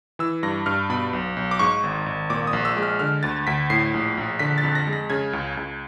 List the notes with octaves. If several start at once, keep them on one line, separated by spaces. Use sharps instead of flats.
E3 E6
G2 A#6
G2 F6
B2 B5
B1
B1
D6
G#2 C#6
G#1
G#1
A#2 D6
D#6
A#1
E6
G#3
F6
D3 F6
D2 A6
D2 B6
A2 C7
A#1
A#1
D3 B6
A6
F2
A#6
G#3
A#6
C#3 G#6
C#2
C#2